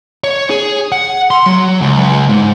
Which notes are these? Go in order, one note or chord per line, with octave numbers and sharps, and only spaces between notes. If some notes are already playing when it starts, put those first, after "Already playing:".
C#5
G#4
F#5
C6
F#3
C#2
G#2